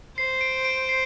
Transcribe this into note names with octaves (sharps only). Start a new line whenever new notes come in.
C5 C7
D7
D7
C7